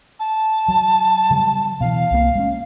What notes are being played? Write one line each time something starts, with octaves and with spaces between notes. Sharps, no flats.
A5
F#3
C#3 F#3 G3
B2 E3 F5
C2 C3 A#3
G#3 A#3 C#4